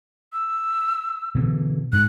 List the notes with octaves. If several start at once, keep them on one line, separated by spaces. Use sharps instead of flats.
E6
B2 D3 E3
G#2 F#6